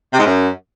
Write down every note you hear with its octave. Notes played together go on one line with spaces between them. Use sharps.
C3
G#2
F#2